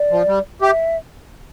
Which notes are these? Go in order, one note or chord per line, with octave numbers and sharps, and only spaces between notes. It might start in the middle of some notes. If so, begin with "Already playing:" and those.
Already playing: D5
F3
G3
G4 E5